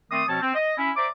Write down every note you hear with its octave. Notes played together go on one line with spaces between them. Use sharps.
D#3 A3 C4 D5 C6 D#6
B2 F3 C4 C#4 C#5 A5
C4
D#5
C#4 E4
C5 D5 E5 A#5 D6